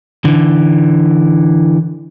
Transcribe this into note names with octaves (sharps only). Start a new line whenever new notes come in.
D3 E3